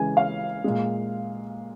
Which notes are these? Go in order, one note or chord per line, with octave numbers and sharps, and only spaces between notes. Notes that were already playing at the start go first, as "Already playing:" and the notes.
Already playing: C#3 E3 G#3 G#5
F5
A#2 G#3